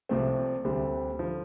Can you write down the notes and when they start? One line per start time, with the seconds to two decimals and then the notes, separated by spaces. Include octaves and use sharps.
0.09 C2 C3 F3 A3 C4
0.64 D2 D3 G3 C4
1.19 D3 F3